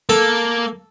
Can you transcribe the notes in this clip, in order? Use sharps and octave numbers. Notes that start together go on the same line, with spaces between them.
A#3 A4